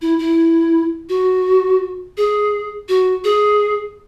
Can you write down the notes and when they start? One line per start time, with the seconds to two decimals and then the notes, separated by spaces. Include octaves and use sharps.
0.02 E4
0.19 E4
1.09 F#4
2.17 G#4
2.89 F#4
3.24 G#4